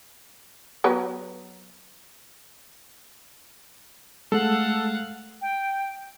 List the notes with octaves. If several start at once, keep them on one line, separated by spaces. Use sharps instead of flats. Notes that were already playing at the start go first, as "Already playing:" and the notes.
F#3 B3 B4
G#3 A3 A4 F5 F#5
G5